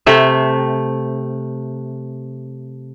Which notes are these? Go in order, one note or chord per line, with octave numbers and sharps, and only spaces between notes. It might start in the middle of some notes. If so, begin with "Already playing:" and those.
C3 A3 E5